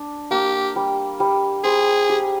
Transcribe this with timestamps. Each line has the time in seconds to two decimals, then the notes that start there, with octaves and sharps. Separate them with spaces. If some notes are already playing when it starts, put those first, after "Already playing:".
Already playing: D4
0.31 A#3 G4
0.76 G3
1.20 G3
1.64 G#4 C5
2.10 G4